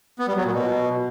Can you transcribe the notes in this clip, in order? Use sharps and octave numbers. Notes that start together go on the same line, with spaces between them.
B3
G3
F#3
A#2
B2